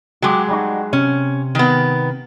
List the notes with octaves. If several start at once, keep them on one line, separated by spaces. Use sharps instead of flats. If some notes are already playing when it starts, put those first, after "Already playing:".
F#3 G#3 F#4 G4
G3 D#4 F#4
C3 C#4
D#3 B3